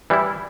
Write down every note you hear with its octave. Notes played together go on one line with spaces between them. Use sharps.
E3 G3 E4